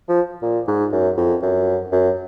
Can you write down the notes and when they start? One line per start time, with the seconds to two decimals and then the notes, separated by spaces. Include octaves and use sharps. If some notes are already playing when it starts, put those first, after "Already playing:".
0.09 F3
0.42 A#2
0.68 G#2
0.92 F#2
1.17 F2
1.43 F#2
1.92 F#2